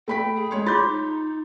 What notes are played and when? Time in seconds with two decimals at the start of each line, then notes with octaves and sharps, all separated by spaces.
0.08 A3 G5 B5 B6
0.35 G#4
0.51 G#3 C#5 C6
0.66 F4 C6 D6 G6 A6
0.85 D#4